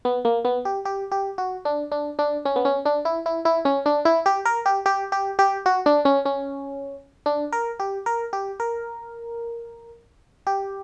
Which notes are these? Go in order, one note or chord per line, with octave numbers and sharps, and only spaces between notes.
B3
A#3
B3
G4
G4
G4
F#4
D4
D4
D4
C#4
B3
C#4
D4
E4
E4
E4
C#4
D4
E4
G4
A#4
G4
G4
G4
G4
F#4
D4
C#4
C#4
D4
A#4
G4
A#4
G4
A#4
G4